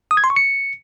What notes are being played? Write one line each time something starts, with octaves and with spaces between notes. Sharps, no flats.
D#6
G#6
C6
C#6
C#7